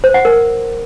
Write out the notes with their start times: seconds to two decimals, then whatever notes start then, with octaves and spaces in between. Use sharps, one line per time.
0.04 C5
0.14 F#5
0.25 A#4